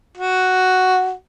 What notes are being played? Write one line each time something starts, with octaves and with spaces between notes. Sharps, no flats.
F#4